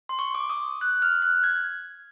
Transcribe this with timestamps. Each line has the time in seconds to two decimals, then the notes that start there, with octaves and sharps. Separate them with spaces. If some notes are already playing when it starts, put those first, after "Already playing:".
0.09 C6
0.19 C#6
0.35 D6
0.50 D#6
0.81 F#6
1.02 F6
1.22 F#6
1.43 G#6